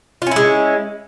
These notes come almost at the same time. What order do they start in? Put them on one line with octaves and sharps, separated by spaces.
F4 C#4 E4 G#3